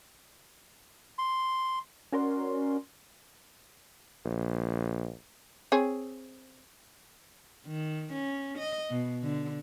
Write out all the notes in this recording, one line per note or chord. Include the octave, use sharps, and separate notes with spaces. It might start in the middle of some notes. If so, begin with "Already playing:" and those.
C6
C#4 F#4 A#4 D5 C6
A#1
C4 G#4 C#5
D#3
C#4
D#5
B2
D3